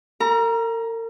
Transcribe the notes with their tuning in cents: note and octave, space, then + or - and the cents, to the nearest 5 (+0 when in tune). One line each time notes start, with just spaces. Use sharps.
A#4 -40 A#5 +20